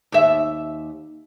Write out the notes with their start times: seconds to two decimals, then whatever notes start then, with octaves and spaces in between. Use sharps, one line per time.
0.12 D#2 E5